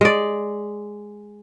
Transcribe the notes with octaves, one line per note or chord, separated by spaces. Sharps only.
G#3 D5